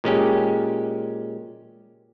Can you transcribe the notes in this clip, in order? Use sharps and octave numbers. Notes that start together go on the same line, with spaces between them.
A#2 G#3 C#4 G4